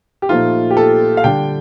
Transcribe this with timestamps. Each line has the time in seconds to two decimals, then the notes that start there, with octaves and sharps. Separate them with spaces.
0.22 G4
0.29 A#2 F3 A3 D#4 F4
0.71 G4
0.77 A4
1.17 F5
1.24 D3 G3 D4 G5